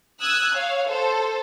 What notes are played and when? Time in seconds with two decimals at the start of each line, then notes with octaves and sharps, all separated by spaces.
0.21 D#6 E6 F#6 G#6
0.55 C#5 F5
0.88 A4 C5